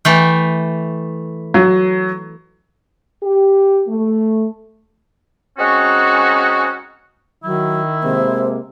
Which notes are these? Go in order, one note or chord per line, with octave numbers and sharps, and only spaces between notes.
E3 A3 G5
F#3
G4
A3
G#3 C4 C#4 D#4 F#4
D#3 F#3 E4
C3 G#3 A#3 C5